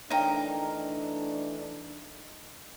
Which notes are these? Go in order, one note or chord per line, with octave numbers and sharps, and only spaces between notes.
E3 A3 D4 D#4 A#4 C#5 F5 G5